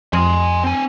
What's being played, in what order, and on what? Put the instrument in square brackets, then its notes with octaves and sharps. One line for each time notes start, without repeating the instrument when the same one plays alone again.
[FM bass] F2 [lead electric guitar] G#5 C6
[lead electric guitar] C4 G#5